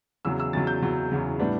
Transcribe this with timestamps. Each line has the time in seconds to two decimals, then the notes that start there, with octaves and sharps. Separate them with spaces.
0.25 E2 C#3 F#3 E6
0.40 E6
0.53 E2 C#3 F#3 A6
0.67 G6
0.82 E2 C#3 F#3
1.11 E2 C#3 F#3
1.39 A2 G3 B3 D4